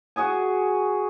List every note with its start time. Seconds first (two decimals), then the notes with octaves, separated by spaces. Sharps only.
0.16 F#4 G#4 D#5 G#5